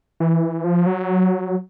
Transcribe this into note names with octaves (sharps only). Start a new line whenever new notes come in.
E3
F3
F#3